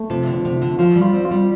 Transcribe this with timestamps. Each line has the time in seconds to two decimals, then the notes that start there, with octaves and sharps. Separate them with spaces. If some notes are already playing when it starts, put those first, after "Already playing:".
Already playing: A3
0.10 C3 F3
0.27 D3
0.33 F3
0.45 C3
0.56 F3
0.61 D3
0.78 F3 F4
0.95 G3
1.01 F4
1.13 C4
1.25 F4
1.31 G3